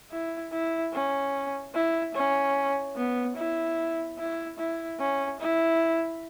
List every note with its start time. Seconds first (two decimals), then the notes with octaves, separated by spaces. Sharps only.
0.11 E4
0.52 E4
0.92 C#4
1.74 E4
2.14 C#4
2.96 B3
3.37 E4
4.18 E4
4.58 E4
4.99 C#4
5.40 E4